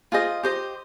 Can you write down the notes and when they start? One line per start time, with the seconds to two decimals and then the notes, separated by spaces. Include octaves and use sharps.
0.12 F4 G#4 C5 D#5
0.43 G4 C5 D#5